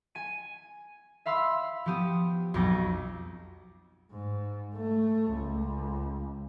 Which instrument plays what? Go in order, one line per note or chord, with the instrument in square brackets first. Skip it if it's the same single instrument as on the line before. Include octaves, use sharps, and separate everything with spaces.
[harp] G#5 D#7
E5 F5 B5 C6 E6
F3 B3 G4 D#6
B1 F2 B2 D6 A#6
[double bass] G#2
A3
C#2